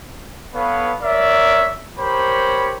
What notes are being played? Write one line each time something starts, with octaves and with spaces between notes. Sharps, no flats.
B3 A4 B4 C#5 F5
A#4 C#5 D5 E5
G4 A#4 C5 C#5 B5